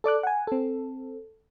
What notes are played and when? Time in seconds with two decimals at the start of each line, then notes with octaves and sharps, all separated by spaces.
0.04 A4 D5 D6 F#6
0.23 F#5 G#5
0.47 C4 A4